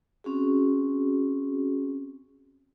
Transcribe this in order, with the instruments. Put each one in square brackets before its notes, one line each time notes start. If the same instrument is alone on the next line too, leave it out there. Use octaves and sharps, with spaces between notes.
[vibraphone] C4 C#4 F#4 G#4